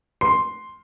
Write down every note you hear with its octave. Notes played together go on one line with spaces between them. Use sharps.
C6